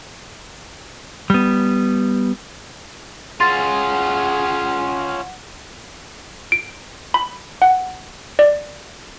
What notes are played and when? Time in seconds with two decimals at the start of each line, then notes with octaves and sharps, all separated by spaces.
1.30 G3 B3
3.40 C#4 F4 G#4 F#5 C6 A6 C7
6.52 D7
7.14 B5
7.62 F#5
8.39 D5